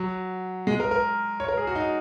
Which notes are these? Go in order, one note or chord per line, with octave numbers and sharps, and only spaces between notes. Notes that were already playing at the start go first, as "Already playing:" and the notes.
Already playing: F#3
G#3
A#4
A#4
C#5
A#4
G#4
F#4
D#4